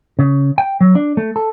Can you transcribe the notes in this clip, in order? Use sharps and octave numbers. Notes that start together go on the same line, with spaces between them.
C#3
G5
F#3
D4
A3
A4